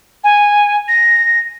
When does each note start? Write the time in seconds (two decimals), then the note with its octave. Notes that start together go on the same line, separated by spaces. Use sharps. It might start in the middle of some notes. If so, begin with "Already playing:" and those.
0.24 G#5
0.88 A#6